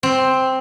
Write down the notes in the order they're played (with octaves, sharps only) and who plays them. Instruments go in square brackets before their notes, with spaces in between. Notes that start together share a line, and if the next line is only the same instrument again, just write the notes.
[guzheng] C4